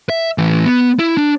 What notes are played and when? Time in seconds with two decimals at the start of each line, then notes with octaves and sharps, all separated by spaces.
0.10 E5
0.38 A2 E3
0.65 B3
0.99 E4
1.17 D4